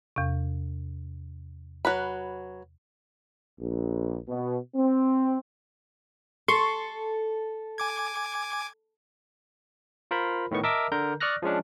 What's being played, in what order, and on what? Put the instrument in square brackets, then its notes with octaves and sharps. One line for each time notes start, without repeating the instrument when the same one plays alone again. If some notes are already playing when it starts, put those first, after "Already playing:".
[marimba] E2 C3
[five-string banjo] F#3 B4 B5
[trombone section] A#1
B2
C4
[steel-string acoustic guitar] A4 [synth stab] C6 C#6
[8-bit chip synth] G#5 D6 G#6
[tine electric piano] F4 A#4 C5 B5
A2 D#3 B3 C#6
A#4 D#5 E5 A5 D6 E6
D3 A#4 A#5 G6
D5 C#6 D#6 F6 F#6 A#6
F3 G#3 C#4 D4